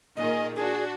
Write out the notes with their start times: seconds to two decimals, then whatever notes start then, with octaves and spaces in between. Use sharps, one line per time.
0.17 A#2 D#3 G#4 D#5
0.56 D4 F#4 G#4